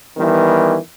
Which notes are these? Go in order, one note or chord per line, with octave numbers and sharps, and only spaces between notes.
D#3 E3 G3 B3